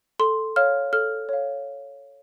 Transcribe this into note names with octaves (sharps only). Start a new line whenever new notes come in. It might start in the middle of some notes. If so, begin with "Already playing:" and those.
A4 C6
C#5 F5 F6
A4 F6
C#5 F5